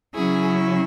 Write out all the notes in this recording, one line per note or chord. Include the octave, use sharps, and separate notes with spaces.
C#3 F#3 C#4 E4 G#4